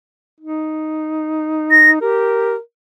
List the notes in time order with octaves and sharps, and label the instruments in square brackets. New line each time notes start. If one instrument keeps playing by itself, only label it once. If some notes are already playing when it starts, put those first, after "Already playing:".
[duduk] D#4
[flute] A#6
[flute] G4 [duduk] A#4